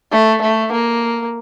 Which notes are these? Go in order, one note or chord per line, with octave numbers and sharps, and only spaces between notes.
A3
A3
A#3